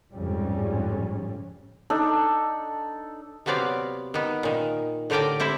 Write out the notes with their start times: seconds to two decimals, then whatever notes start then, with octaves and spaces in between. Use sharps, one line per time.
0.15 A1 F2 G#2 C#3 G3 C#4
1.90 D4 D#4 A4
3.46 C3 F#3 B3 C4 D5 F5
4.14 D#3 B3
4.43 A#2 D#3
5.10 A2 D3 G4 A#4 D5 G5
5.40 G3 C4 E4 E5